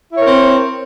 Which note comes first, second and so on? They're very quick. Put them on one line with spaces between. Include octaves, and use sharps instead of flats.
E4 C#5 A#4 C4